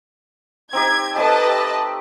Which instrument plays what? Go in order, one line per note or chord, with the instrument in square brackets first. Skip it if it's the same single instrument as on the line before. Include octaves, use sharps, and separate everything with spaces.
[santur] C4 D#4 G4 [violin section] G#6
[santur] A3 C4 G4 [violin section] B4 D#5 A5